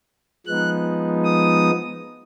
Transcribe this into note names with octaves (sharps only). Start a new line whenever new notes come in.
F3 G#3 B3 D#4 F#6
D#6